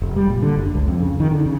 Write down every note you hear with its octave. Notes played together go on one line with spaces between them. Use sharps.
F1
G3
A#2
D3
F#1
C#2
F2
C#3
D#3
D3
C#3